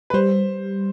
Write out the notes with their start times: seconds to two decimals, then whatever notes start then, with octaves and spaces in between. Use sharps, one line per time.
0.10 B4
0.14 G3 C5